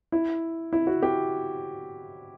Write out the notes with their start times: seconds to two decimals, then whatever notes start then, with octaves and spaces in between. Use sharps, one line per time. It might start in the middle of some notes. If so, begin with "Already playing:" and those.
0.12 E4
0.73 E4
0.87 F#4
1.03 G4